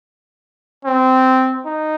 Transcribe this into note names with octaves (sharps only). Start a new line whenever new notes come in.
C4
D#4